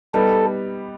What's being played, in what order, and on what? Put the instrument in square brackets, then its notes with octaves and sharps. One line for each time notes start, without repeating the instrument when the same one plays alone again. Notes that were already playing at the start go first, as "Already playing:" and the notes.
[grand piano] G3 B3 D#4 G4 [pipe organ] A4